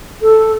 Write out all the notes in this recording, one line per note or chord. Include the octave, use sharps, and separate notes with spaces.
A4